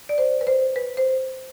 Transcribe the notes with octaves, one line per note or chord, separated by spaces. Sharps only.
D5
C5
B4
C5
B4
C5